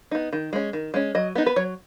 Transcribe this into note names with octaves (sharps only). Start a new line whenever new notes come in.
B3 D#4
D#3
G#3 C#4
D#3
G#3 C#4
F#3 D#5
B3 D#4
B4
F#3 C#5